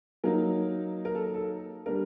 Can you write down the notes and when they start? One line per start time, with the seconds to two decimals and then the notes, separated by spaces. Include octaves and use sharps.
0.24 F#3 A#3 D#4 A#4
1.05 A#4
1.15 A4
1.34 A4
1.86 G3 D4 A#4